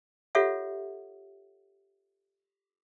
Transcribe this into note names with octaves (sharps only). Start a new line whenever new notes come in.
F4 G4 A4 C#5 E5 F#5